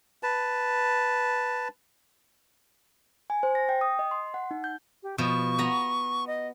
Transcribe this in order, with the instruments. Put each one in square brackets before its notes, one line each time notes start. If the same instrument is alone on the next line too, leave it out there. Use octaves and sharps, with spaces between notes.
[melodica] B4 A5
[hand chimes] G#5
C5
A#6
G5
D#6
D#5
C6
F#5
D#4
G6
[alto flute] G4
[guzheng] B2 F3 [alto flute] C#6
[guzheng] B3 A#5
[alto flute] D#5